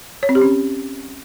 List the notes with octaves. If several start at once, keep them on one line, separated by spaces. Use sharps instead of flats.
C#5
C4
G4
C#4